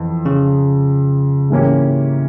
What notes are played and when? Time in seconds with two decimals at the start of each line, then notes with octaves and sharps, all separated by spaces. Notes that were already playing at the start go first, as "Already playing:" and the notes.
Already playing: F2 E3
0.26 C#3
1.50 G#2 E3 A#3 C#4 G4